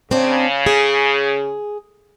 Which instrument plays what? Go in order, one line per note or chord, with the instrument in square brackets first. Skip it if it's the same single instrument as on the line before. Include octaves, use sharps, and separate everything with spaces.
[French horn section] C#3 [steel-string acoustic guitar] C4 D4
[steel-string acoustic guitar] G#4